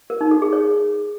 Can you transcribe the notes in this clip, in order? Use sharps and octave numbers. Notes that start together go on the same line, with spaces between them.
A#4
D#4
A4
G#4
C#5